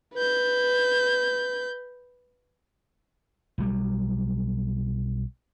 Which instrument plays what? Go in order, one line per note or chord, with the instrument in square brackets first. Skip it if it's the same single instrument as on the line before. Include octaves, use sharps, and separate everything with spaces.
[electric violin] B4 G6
[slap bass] B1 F#3 G3